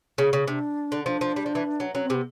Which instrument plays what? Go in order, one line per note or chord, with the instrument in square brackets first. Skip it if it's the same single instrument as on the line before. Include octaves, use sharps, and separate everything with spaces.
[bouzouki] C#3
C#3
[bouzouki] C3 [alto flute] D4
[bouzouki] D3
[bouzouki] F3 [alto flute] D4
[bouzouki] F3
G3
F3
E3
F#3
[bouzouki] F#3 [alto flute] C#4
[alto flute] C4
[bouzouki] C3 [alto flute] B3